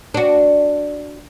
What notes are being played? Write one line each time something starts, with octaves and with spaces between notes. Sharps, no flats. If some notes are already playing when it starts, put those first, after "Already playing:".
D4 F#4